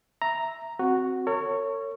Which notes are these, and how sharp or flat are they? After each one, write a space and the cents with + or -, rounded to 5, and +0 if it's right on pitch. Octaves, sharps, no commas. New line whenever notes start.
E5 +0 A#5 +0
C4 +0 F#4 +0
A#4 -45 C#5 +0